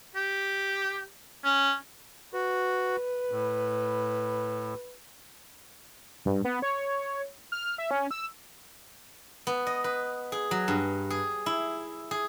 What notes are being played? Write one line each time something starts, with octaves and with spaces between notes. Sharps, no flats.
G4
C#4
F#4 B4
A2
G2
B3
C#5
F6
E5
C#4
E6
B3
D#5
B4
G#4
F#3
G2
G#4
E4
G#4